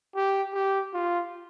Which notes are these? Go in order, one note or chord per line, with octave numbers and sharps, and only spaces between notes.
G4
G4
F4